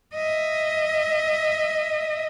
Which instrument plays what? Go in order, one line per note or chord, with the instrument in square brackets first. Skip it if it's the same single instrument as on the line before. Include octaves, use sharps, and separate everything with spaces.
[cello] D#5 E5